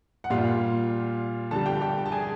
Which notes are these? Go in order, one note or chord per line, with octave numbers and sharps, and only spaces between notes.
F#5
A#2 G3 F4 F5
D3 G3 A4 A5
G4 G5
G4 G5
A5
G#4 G#5